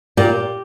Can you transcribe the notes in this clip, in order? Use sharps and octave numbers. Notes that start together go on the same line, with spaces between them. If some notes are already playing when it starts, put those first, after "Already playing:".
A#2 G4